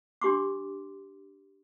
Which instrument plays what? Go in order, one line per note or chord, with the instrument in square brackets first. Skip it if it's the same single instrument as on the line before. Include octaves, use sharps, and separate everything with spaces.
[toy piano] D4 G4 C6 D6